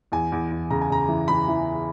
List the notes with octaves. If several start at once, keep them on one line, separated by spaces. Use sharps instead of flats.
E2 G#5
E2
E2
C#3 A#5
G#5
C#3 A#5
E3
E3 B5
E3